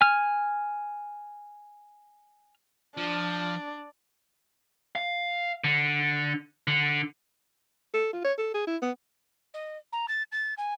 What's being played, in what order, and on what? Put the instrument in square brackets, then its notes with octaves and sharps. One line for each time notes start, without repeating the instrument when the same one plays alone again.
[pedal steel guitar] G#5 F6
[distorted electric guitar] F3 [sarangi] D4
[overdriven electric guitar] F5
D3
D3
[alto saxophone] A4
F4
C#5
A4
G#4
E4
B3
[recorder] D#5
A#5
A6
A6
G#5